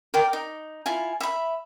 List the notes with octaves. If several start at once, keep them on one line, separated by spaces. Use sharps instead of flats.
A#4 D5 G5
D#4
E4 F4 G#5
E5 B5